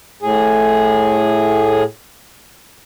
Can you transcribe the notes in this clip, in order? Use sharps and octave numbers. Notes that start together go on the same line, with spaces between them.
A2 G#4